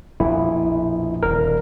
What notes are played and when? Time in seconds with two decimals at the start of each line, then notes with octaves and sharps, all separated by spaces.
0.20 A#1 F2 B2 E4
1.23 D#1 D3 A#4